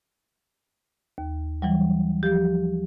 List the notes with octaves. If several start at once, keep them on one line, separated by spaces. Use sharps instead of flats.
D#2
E3 F#3 G3
F3 G4